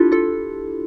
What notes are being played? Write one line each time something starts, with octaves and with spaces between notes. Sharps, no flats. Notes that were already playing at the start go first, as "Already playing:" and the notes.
Already playing: D4 E4 F4 G4 A4
F4 A4